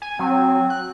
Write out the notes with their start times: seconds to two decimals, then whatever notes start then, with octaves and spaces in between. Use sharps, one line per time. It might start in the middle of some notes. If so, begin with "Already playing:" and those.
0.02 G#5
0.19 F#3 C4
0.70 F#6